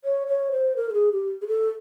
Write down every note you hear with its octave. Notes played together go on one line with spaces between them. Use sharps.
C#5
C#5
C5
A#4
A4
G#4
G4
G#4
A4